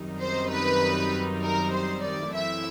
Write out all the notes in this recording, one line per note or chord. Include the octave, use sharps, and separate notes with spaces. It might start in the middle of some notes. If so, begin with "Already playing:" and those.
Already playing: F#2 D#3 G3 C4 D#4
C5
B4
A#4
C5
D5
E3 A3 C4 E4 E5